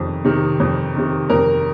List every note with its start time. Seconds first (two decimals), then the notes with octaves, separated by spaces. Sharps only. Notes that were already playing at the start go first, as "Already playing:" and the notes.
Already playing: F2 C3 D#3
0.25 C3 D#3
0.60 F2
0.95 C3 D#3
1.30 F2 A#4